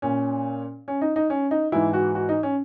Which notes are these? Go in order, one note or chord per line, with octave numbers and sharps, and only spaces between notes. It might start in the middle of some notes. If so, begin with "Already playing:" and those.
A#2 C#4
C#4
D#4
D#4
C#4
D#4
G#2 E3 E4
F#4
F#4
D#4
C#4